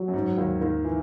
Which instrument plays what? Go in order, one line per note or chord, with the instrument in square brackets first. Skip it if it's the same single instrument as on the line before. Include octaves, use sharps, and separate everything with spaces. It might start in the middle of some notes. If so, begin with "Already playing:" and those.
Already playing: [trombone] F#3
[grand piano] F#2
G#2
D#2 D#3
D#2 D#3
E3